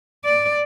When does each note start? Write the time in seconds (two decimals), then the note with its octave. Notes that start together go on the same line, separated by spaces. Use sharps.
0.25 D5